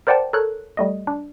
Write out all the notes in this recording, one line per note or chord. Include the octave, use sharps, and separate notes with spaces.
A#4 C5 D5 F#5 G5 A5
A4 A#4 C#5 F#6
G3 A3 D#5
D4